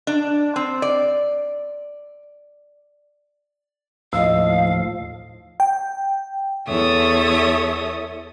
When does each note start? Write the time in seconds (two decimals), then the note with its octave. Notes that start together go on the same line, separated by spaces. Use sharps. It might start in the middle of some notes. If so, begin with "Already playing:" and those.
0.07 D4
0.56 C4
0.82 D5
4.13 D#2 A2 F3 D#5 F5 E6
5.60 G5
6.67 E2 A4 C#5 E5 D#6